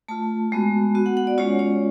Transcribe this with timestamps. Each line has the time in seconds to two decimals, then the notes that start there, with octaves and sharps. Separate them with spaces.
0.08 A3 F4 A5
0.52 G#3 B3 F#4
0.95 B3 F#4
1.06 F#5
1.17 F#5
1.27 D5
1.38 G#3 C#4 F4 C#5
1.59 C#5